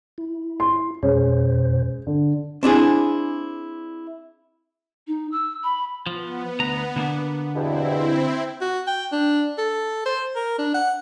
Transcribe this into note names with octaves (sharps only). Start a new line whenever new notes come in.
E4
C6
F2 B2 G#3 C#4 C5
D3
C4 D4 E4 G#4
D#4
E6
B5
F3 B3
D2 A#5
D3 A#3 D4
E2 G2 B2 C4 E4
F#4
G5
D4
A4
C5
A#4
D4
F#5